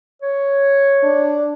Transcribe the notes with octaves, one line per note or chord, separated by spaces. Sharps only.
C#5
D4